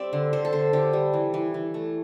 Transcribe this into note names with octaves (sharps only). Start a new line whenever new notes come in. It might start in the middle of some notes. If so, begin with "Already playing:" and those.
Already playing: G3 C4 D5 E5
D3
D3 C5
A4
D3 C5
D3 G4
G3
E3
E3
E3
A3